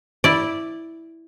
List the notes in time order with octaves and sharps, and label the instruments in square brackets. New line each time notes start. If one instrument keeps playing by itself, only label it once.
[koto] E4 D5